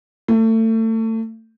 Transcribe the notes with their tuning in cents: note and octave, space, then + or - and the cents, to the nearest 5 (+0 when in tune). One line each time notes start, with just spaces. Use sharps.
A3 +30